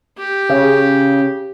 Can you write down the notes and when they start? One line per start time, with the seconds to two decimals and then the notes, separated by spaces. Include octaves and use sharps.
0.18 G4
0.49 C#3